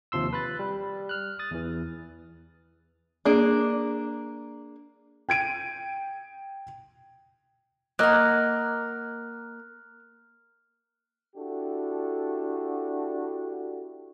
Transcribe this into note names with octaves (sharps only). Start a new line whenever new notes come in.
D#2 C3 F3 C6 E6
B4 B5 F#6 A6
G3
F6 F#6
D#6 A6
E2 E3
A#3 D4 G#4
G5 G#6 D7 D#7
A#3 A#4 D#5 F#5 F6 F#6
D4 E4 F#4 G4 A4